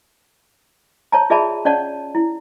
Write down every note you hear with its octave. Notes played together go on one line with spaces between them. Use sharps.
C#5 A5 A#5
F4 G#4 D5 E5 A5 B5
C#4 C#5 D5 F#5 A5
E4